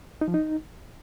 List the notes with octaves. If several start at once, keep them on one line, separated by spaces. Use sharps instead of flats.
D#4
F3
D#4